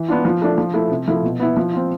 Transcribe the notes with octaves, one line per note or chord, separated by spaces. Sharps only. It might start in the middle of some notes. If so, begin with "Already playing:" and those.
Already playing: E3
B3 D4 F4
F3
A3 D4
F3
A3 E4
C3
F3 A3 E4
B2
B3 E4
F3
C4 F4